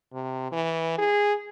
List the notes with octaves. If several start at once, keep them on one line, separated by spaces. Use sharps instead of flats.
C3
E3
G#4